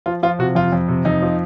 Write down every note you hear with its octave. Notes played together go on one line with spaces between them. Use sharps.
F3 F4
F3 F4
C3 F#4
F2 F4
F2
C3
F2 D#4
F3